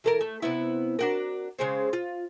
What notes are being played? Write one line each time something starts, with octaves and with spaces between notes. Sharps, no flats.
E3 A4 A#4
A3
C3 B3 E4
D4 F#4 A#4
C#3 G#3 C4
F4